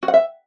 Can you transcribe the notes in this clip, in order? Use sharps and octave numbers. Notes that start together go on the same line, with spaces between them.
F#4
F#5
E5